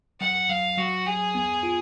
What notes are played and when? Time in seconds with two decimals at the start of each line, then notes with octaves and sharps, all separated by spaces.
0.20 F#3 F#5
0.49 F#3 F5
0.77 F#3 F#4
1.06 F#3 G#4
1.35 B3
1.63 F4